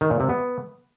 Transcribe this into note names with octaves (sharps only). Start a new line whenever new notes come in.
D#3
A#2
C3
B3